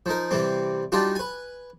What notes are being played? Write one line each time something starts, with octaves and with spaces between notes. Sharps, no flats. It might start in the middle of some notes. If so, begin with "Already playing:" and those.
F3 D#4 A#4
C3 E3 G3 C4
G3 D4 D#4 F4 F#4
B4 G#5